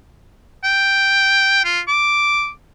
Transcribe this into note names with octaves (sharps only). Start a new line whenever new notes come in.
G5
F4
D6